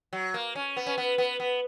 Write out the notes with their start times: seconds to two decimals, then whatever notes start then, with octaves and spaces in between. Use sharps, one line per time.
0.13 F#3
0.34 A#3
0.55 C#4
0.77 B3
0.87 C#4
0.98 B3
1.18 B3
1.40 B3